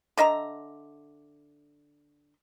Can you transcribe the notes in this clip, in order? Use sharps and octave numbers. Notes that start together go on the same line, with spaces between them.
D3 D#5 E5 A#5